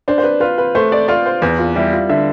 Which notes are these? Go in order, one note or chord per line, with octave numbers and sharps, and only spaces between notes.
D4 C5
C5
B4
F4 B4
B4
A3 C5
D5
F4 D5
C5
E2 B4
F4
G3 E4
F4
D3 E5